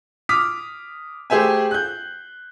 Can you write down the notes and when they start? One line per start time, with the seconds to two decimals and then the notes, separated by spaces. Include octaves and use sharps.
0.29 D6 D#6 F6 B6
1.30 A3 G4 G#4 C5 E5 G#5
1.71 F#6 G6